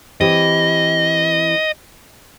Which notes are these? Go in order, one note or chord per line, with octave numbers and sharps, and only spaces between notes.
E3 C4 G4 D#5